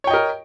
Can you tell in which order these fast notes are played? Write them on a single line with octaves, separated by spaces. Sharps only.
C#5 G5 D#5 A#4